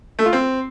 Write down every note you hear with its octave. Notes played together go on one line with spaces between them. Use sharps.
A3
F4
C4